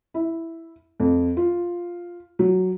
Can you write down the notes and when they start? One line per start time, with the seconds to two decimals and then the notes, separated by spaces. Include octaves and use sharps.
0.14 E4
1.00 F2
1.37 F4
2.39 F#3